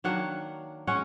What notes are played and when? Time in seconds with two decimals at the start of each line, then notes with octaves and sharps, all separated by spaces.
0.04 D#3 F#3 A#3 D4 F#5
0.87 G#3 C#4 F#5